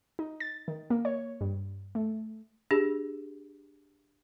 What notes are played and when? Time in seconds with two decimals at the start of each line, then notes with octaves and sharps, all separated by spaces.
0.19 D#4
0.40 A6
0.68 D#3
0.90 A#3
1.05 C#5
1.41 G2
1.95 A3
2.71 D4 G4 G#4